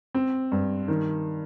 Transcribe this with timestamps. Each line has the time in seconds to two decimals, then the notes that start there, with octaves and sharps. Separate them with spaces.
0.14 C4
0.52 G2
0.88 D#3